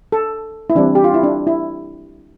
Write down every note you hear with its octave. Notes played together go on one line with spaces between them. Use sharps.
A4
E4
E3 G3 C4 D4
G4
F4
E4
D4
E4